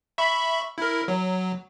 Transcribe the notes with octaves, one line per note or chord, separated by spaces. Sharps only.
E5 B5 C#6
E4 A#4
F#3